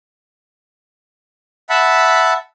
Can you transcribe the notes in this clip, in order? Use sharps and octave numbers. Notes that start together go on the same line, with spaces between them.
E5 F#5 A5 B5